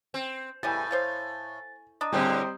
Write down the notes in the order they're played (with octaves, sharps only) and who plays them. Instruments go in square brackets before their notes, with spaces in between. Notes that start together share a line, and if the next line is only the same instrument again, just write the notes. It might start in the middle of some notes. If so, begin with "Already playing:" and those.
[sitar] C4
[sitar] A2 [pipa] C#3 E3 G3 [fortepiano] G#5 [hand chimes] A6
[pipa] C5 C#5 F5 [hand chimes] A6
[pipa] D4 [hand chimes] D#5 A#5 D#6
[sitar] A2 D3 G#3 [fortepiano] G3 C4